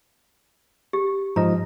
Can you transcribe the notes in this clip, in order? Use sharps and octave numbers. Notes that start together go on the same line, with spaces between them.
G4
G#2 F3 D#5 A#5